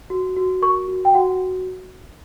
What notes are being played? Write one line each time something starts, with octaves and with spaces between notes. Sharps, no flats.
F#4
F#4
A#4 C#6
F#4
G5
F#4 F#5